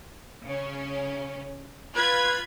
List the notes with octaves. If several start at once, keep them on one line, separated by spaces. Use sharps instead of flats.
C#3 C#4
F4 B4 B5 G#6